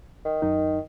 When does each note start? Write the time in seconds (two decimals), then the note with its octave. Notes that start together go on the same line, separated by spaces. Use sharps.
0.25 D#3
0.42 F#2 D#4